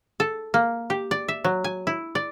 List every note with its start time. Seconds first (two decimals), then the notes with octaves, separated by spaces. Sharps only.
0.20 A4
0.54 A#3
0.90 G4
1.11 D5
1.28 E5
1.44 F#3
1.64 G#5
1.87 E4
2.15 D5